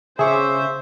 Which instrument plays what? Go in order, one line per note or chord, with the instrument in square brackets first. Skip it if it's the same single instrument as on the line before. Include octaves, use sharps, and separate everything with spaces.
[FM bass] C#3 [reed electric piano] G#4 C#6 D6 [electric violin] C5 [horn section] E5